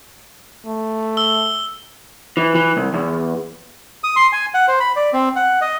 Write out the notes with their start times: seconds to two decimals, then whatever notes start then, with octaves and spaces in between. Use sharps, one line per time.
0.66 A3
1.17 E6 G7
2.37 E3
2.55 E3
2.77 C2
2.94 E2
4.04 D#6
4.16 C6
4.33 G#5
4.54 F#5
4.68 C5
4.80 B5
4.96 D5
5.13 C4
5.36 F#5
5.61 D#5